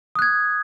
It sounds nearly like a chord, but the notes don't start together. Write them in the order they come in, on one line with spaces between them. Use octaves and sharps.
D#6 F#6 G#6